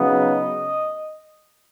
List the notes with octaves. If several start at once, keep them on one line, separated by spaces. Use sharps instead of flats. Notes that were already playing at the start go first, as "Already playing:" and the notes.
Already playing: C#3 F#3 B3 D#4 D#5